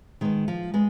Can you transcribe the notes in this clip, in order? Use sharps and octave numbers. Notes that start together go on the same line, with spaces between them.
D#3 G#3 B3
F3
G#3 B3